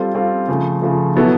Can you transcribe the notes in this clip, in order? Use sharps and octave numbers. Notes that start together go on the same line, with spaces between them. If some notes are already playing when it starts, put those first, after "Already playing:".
Already playing: G3 C4 F4 A4
G3 C4 F4 A4
C#3 F3 A3
C#3 F3 A3
B2 F#3 B3 E4 A4